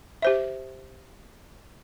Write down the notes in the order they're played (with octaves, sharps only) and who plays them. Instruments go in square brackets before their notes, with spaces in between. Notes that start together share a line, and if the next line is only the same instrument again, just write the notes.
[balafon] G4 C5 E5